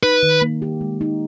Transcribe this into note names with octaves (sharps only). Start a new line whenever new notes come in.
D#4 B4
D#3
A#3
G4
G#3
D#4